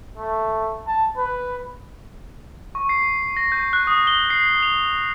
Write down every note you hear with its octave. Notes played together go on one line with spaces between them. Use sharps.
A3
A5
B4
C#6
C7
A#6
G6
F#6
D#6
G7
C7
F7